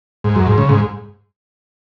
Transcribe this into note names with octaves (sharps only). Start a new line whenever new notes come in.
G#2
F#2
G#2
C#3
G#2